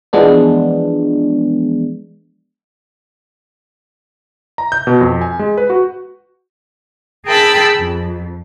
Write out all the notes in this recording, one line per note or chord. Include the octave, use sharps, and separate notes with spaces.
E3 F3 G#3 B3 D4
A#5
G6
B2
F2
G#5
G#3
B4
F#4
G#4 A#4 G5 A5 B5 E6
F2